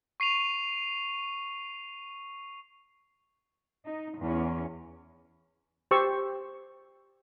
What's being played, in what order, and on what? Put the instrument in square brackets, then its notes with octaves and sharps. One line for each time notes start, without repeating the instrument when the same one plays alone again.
[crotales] C#6 C7 D#7 F7
[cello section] D#4
E2 C#4
[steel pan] G4 C5 C#6 E6